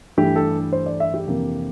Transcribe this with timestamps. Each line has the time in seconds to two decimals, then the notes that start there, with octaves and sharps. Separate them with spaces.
0.17 G2 E3 A3 D4 G4
0.36 A4
0.72 C5
0.86 D5
1.00 E5
1.14 G4
1.27 F2 C3 E3 A#3 D4